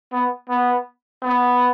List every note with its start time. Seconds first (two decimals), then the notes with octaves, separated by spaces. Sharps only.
0.12 B3
0.49 B3
1.23 B3